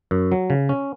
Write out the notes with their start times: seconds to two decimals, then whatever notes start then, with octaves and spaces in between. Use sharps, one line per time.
0.11 F#2
0.32 F#3
0.50 C#3
0.69 C#4